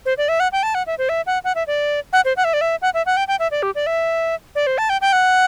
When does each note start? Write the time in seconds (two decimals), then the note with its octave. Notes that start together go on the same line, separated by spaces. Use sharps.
0.06 C5
0.18 D5
0.29 E5
0.40 F#5
0.52 G5
0.63 A5
0.75 F#5
0.87 E5
0.98 C5
1.09 E5
1.27 F#5
1.44 F#5
1.55 E5
1.67 D5
2.13 F#5
2.25 C5
2.37 F#5
2.44 E5
2.54 D5
2.61 E5
2.82 F#5
2.94 E5
3.06 F#5
3.17 G5
3.28 G5
3.39 E5
3.51 D5
3.63 G4
3.75 D5
3.87 E5
4.55 D5
4.67 C5
4.78 A5
4.90 G5
5.01 G5
5.13 F#5